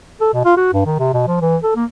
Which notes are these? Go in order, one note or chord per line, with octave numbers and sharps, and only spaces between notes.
A4
B2
F4
F#4
G2
D#3
C3
B2
F3
E3
A4
A#3